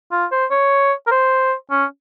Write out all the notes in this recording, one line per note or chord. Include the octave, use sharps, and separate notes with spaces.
F4
C5
C#5
A#4
C5
C#4